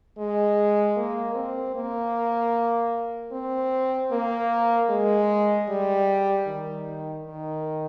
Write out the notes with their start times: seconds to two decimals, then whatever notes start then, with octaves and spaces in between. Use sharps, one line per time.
0.18 G#3
0.97 A#3
1.35 C4
1.75 A#3
3.32 C4
4.12 A#3
4.89 G#3
5.69 G3
6.47 D#3
7.26 D#3